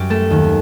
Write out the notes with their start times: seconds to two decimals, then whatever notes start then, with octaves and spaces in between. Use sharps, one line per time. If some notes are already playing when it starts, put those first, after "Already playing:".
Already playing: F#2 G4
0.10 A3 A4
0.30 D#2